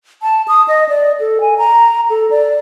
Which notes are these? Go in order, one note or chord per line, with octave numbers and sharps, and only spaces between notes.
A5
D#6
D#5
D5
A4
G#5
A#5
A4
D5